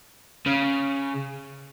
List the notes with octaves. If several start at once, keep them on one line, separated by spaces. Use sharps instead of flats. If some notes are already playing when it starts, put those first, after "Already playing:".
C#3